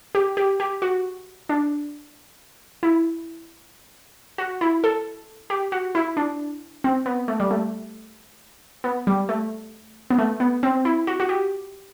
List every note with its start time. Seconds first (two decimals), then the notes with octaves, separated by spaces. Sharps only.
0.15 G4
0.37 G4
0.60 G4
0.82 F#4
1.49 D4
2.83 E4
4.38 F#4
4.61 E4
4.84 A4
5.50 G4
5.72 F#4
5.95 E4
6.17 D4
6.84 C4
7.06 B3
7.28 A3
7.40 G3
7.51 A3
8.84 B3
9.07 G3
9.29 A3
10.10 B3
10.18 A3
10.40 B3
10.63 C4
10.85 E4
11.07 F#4
11.20 F#4
11.29 G4